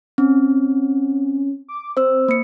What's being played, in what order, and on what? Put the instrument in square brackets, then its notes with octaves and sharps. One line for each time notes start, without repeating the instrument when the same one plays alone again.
[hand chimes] C4 [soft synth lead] C#4
[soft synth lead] D6
[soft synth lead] C4 [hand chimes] C5 E6
[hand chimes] A#3 C#7